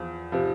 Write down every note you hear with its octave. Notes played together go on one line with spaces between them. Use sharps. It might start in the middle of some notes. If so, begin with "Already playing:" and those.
Already playing: E2 F3
C3 F3